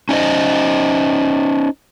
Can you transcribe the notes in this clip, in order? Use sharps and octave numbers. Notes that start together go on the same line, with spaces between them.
C#4 D#4 C5 D#5